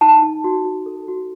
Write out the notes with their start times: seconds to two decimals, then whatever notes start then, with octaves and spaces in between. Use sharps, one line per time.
0.01 D#4 A5
0.22 D#4
0.44 F#4
0.65 F#4
0.86 A4
1.08 F#4